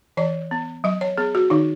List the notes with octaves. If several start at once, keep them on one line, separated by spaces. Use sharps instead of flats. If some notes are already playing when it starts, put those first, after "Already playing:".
E3 C#5
B3
F#3 D#5
C#5
B3 G#4
F#4
D#3 D#4